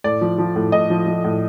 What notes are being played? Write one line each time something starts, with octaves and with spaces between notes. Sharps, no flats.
A2 D5
F3
F3
A2
A2 D#5
F3
F3
A2